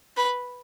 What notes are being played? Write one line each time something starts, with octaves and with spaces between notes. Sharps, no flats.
B4